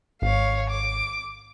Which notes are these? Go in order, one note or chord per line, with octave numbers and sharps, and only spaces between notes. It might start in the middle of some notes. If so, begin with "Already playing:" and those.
G#1 C#5 F5
D6